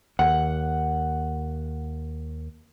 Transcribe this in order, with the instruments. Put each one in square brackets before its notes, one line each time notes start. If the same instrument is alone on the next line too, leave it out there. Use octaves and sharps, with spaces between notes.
[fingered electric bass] D#2 [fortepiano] F#5